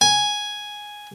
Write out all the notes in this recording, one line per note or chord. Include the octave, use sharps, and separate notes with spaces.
G#5